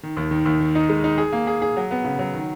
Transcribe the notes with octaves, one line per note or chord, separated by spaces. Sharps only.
D#3
D#2
D#3
D#2
D#3
D#4
G#3
D#4
G#4
A#3
G#4
G#4
F#3
B3
C#3
F#3
D#3